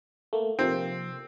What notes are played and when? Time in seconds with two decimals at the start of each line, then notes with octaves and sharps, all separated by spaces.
0.33 A3 A#3
0.59 C3 F3 A#3 C4